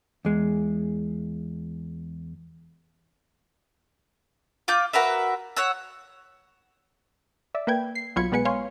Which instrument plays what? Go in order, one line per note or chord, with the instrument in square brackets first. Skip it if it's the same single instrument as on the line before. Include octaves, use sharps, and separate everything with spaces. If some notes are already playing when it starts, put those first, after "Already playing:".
[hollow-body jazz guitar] E2 G#3
[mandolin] F4 D6 G6
F#4 A#4 B4 E5
C#5 F#5 E6
[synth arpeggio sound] D5 E5
A#3 B4 G5 G#6
C7
B1 F#3 F4 B5 G#6 C#7
B2 G#3 B3 B4 G#5 C#7
C#5 F5 G#5 C6